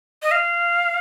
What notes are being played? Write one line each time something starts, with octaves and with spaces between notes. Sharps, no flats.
D#5
F5